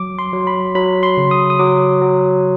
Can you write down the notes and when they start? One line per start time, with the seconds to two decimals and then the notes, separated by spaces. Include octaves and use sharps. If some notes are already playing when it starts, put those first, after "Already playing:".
Already playing: F#3 D6
0.19 C6
0.33 F#3
0.47 B5
0.75 F#3 B5
1.03 C6
1.17 C#3
1.31 D#6
1.50 D#6
1.59 F#3 D6
2.01 F#3